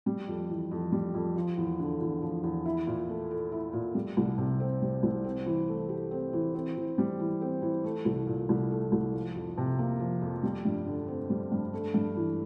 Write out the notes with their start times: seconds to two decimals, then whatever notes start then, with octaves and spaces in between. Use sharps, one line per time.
0.06 G3
0.28 F2
0.50 E3
0.71 F2
0.92 G3
1.14 F2
1.36 F3
1.57 E2
1.80 D3
2.01 E2
2.22 F3
2.43 E2
2.65 E4
2.87 A#2
3.09 A3
3.31 A4
3.52 E4
3.73 A#2
3.95 G3
4.17 C2
4.38 C3
4.60 C4
4.82 G3
5.03 C2
5.24 C4
5.46 E3
5.68 A3
5.89 G4
6.11 C4
6.33 E3
6.55 C4
6.77 E3
6.98 G3
7.20 E3
7.41 C4
7.62 E3
7.84 A3
8.05 C2
8.27 A#2
8.49 C2
8.71 A3
8.92 C2
9.13 F3
9.35 F2
9.58 C3
9.79 A#3
10.00 F3
10.22 F2
10.43 G3
10.65 G2
10.86 D3
11.08 C4
11.30 G3
11.52 G2
11.73 A3
11.94 G2
12.16 E3